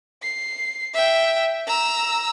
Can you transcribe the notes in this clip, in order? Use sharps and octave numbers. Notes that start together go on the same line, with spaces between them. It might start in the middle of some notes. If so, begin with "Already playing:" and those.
C7
E5 G5
A#5 E6